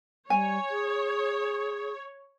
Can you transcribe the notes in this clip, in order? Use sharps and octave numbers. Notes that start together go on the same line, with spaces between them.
G3 C#5 G#5
G#4